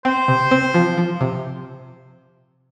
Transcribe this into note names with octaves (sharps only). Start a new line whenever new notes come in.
C4 C5
C3
C4
F3
F3
C3